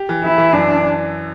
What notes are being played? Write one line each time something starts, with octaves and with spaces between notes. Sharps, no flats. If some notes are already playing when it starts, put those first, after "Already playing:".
Already playing: G4
E3
E3 E4
E3
F#2 D4